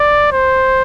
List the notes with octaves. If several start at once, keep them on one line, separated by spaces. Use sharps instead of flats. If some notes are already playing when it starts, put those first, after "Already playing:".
Already playing: D5
C5